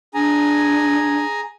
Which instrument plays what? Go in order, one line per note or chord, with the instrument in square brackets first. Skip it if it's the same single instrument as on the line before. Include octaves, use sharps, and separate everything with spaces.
[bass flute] D4 [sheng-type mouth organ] G#4 G#5 A#5